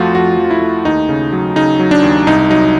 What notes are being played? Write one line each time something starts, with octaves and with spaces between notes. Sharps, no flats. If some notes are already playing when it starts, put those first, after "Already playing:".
Already playing: F2 F3 A3 F4 F#4
F2 F#4
F3
E4
A3
D#2 D#4
C#3
F#3
C#3 D#4
F#3
D4
D#2
C2 D#4
F#3 D#4